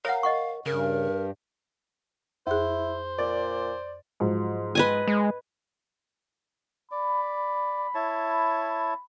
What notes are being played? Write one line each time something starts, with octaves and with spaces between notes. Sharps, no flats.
A#4 C#5 F5 F#5
D#5 F#5 C#6
G2 C#3 A#4
F2 E4 G#4 C5
A#2 D5
G#2 F3 F#3
B4 D#5 G#5
G#3
D5 B5
E4 C#5 A5